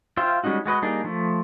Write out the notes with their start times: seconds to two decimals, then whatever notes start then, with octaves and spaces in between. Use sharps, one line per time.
0.17 F4 C5 E5 F5 G5
0.44 G3 G#3 C#4 D#4 F#4
0.65 G#3 F#4 B4 D#5
0.82 G3 A#3 D4 D#4 G#4
1.04 F3 A3